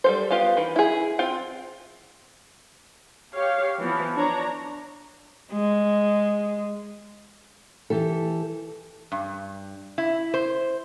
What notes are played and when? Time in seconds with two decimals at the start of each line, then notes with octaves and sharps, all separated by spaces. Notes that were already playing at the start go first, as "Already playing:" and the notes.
0.04 G3 A4 C5
0.31 B3 F4 G4 F5
0.57 D#3 E3
0.76 E4 G#4
1.19 C4 F4 G5
3.33 G4 C#5 F5
3.80 E3 F3 B3
4.16 D4 C#5 A#5
5.52 G#3
7.90 E3 G4 A4
9.12 G2
9.98 E4
10.34 C5